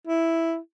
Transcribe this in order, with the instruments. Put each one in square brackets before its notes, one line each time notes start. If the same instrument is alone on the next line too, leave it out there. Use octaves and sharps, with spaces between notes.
[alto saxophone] E4